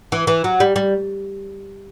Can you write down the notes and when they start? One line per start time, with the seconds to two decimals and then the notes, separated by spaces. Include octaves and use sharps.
0.12 E3
0.27 E3
0.44 F#3
0.60 G3
0.76 G3